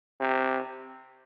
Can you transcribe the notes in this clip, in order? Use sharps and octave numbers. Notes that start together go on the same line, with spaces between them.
C3